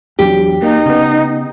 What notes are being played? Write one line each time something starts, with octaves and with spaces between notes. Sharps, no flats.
E2 F#3 D4 G4
A#3 D#4
C#3 B3